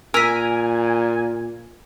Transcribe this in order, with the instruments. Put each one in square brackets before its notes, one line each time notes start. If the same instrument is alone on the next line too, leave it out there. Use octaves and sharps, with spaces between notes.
[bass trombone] A#2 [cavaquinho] A#4 [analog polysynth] G#5 [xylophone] E6 B6